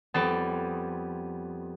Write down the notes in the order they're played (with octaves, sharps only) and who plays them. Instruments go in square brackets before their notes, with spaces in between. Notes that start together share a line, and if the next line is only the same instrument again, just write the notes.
[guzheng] F2 G3 A5 [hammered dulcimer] B3